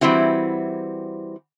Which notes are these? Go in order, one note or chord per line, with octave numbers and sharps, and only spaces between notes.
E3 G3 C4 E4 F#4